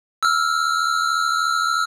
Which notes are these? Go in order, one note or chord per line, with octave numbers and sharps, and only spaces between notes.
E6 F6